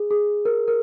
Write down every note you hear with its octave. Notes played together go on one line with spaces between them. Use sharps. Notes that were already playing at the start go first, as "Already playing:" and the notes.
Already playing: G#4
G#4
A#4
A#4